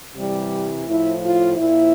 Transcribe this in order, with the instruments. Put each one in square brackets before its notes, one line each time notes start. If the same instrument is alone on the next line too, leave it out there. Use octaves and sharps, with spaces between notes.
[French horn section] C3 E3 G3
A2 F3 E4
F4
A#2 F3 E4